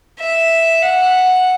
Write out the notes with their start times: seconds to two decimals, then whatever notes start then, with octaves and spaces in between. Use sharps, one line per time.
0.20 E5
0.82 F#5